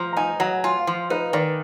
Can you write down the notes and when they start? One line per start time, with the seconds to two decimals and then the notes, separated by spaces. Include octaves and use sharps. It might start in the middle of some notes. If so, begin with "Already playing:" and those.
Already playing: F3 A#5
0.13 A#5
0.16 D#4 G#5
0.40 F#3 A#5
0.64 F4 G#5
0.79 F5
0.87 F3
1.10 D#4 B4
1.33 D#3 D5